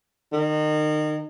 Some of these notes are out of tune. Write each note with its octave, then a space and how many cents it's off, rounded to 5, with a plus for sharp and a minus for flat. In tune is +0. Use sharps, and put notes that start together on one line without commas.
D#3 -30